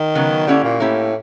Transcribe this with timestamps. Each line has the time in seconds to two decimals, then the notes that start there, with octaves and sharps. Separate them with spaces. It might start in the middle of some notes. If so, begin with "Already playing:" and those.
Already playing: D#3
0.15 C#3 F#3 B3
0.47 D3 A#3 C#4 E4 G4
0.64 A#2
0.80 A2 A#3 C#4 E4 G4